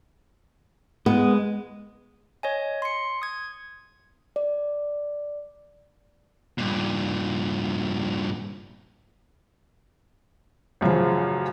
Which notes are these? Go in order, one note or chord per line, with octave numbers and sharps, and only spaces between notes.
G#3 B3
C#5 D#5 G#5
C6 C#7
D#6 G#6
D5
G2 A#2
A1 F#2 C#3 F3